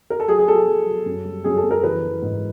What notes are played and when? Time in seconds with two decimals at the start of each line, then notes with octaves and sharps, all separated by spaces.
0.10 A#4
0.20 A4
0.28 F#3 G#4
0.38 G#4
0.48 F#3 A4
0.68 F#3
0.87 F#3
1.06 F#2
1.25 G3
1.44 F#2 G#4
1.57 A4
1.64 F#2
1.71 A#4
1.84 E3 B4
2.03 E3
2.22 G#2